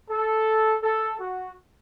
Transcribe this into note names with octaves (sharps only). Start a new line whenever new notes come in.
A4
A4
F#4